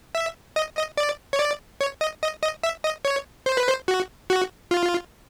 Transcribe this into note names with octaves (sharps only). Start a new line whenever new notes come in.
E5
D#5
D#5
D5
C#5
D5
C#5
D#5
D#5
D#5
E5
D#5
C#5
C5
B4
C5
F#4
F#4
F4